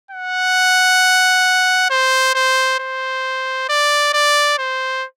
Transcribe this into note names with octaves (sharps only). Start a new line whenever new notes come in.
F#5
C5
C5
C5
D5
D5
C5